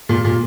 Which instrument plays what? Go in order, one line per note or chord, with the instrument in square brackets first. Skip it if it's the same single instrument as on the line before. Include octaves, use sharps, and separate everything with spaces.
[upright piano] A#2
A#2